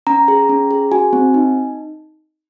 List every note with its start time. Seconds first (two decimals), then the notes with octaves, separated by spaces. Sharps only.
0.07 C#4 A#5
0.28 G#4
0.49 C#4
0.71 G#4
0.92 F#4 G#5
1.13 C4
1.34 D#4